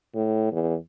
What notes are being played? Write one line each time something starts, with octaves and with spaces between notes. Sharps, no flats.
A2
E2